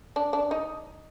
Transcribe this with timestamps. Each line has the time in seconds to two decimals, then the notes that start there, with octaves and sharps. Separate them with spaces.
0.16 D4
0.33 D4
0.51 D#4